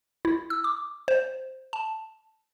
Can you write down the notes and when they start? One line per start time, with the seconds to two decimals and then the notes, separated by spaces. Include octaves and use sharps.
0.25 E4
0.50 E6
0.64 D6
1.08 C5
1.73 A5